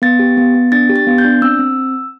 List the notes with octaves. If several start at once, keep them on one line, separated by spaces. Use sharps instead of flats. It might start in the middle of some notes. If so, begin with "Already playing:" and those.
B3 A6
G4
B3
B3
D4 A6
G4
A6
B3
G6
D4
C4 E6
C4